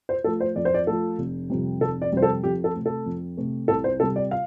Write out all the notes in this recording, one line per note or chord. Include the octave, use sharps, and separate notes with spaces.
C5
F3 A3 A4
C5
F2 D5
C5
D5
F3 A3 A4
F1
F2 C3 G3
F1 A4
D5
F2 C3 G3 C5
A4
F2 G4
A4
C3 A3
A4
F2
C3 A3
C2 A4
C5
C3 G3 A4
D5
F5